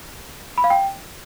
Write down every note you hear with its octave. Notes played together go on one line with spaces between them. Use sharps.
B5
F5
G5